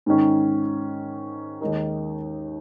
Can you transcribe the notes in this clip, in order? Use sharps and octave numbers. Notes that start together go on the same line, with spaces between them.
G#2 D#3 C#4
D#2 D#3 G#3 D#4 A#4